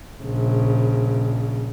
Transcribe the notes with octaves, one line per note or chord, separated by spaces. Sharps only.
A#1 C#3